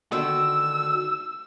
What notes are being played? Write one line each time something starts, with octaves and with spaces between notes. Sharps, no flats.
D3 D#3 F#4 E6